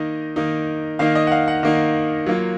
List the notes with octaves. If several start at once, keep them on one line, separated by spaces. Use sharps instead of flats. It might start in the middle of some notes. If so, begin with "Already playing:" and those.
Already playing: D#3 A#3 D#4 D#5
D#3 A#3 D#4
D#3 A#3 D#4 F5
D#5
F#5
F5
F#5
D#3 A#3 D#4
F#3 A#3 F4